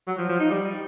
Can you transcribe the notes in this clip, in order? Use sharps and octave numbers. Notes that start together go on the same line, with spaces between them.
F#3
F3
F3
D#4
G3